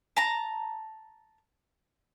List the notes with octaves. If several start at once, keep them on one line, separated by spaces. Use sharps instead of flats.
A5 A#5